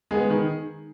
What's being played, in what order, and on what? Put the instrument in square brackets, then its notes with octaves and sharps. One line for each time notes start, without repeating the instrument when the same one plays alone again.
[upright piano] G#3 B3 G#4
D#3